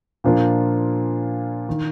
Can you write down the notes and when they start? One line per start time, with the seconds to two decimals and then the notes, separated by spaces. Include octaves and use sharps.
0.24 A#2 F3 A#3 D4 F4
1.69 D#3